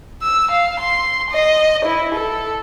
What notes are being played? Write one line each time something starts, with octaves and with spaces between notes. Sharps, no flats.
E6
F5
C6
D#5
E4
A4